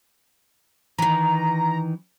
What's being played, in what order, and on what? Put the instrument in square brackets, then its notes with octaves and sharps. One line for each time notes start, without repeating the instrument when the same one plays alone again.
[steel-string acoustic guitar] D#3 E3 [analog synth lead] A#5